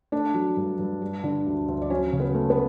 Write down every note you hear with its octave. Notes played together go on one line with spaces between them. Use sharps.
A3 D4 D5
F#3
G2
G2
G3
D3
D2
D2
D5
F#3 C#4 C#5
C#3
B3 B4
A3
B3 B4